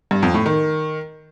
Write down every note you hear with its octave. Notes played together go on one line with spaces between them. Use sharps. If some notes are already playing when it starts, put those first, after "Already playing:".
G2
F2
A2
D#3